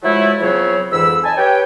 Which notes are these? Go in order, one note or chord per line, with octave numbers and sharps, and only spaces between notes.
F3 F#3 G#3 A3 E4
C#3 F3 F#3 B3 C4 C#5
F2 G#2 E3 B5 E6
D#5 G#5 A5
G4 B4 C#5 G5